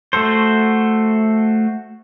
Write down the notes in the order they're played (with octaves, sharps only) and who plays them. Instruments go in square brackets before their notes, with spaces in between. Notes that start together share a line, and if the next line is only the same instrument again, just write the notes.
[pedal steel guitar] A3 F#4 A4 C5